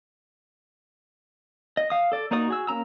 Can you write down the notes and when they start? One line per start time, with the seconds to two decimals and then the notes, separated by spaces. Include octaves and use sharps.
1.77 D#5
1.90 F5 D#6
2.12 A4 D5
2.31 A#3 D#4 F#4 D5 D#6
2.48 F#4 G#4 E6
2.67 A#3 C#4 A#5 E6